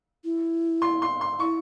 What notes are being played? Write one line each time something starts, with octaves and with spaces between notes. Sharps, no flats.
E4
C6
C6
C6
E4 C#6